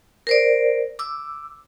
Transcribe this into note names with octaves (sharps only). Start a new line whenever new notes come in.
A#4 C5 D5
D6 E6